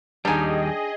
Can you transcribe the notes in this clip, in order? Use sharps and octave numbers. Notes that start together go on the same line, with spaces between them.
D#2 G3 D4 D#4 G#4 D#5 G5 G#5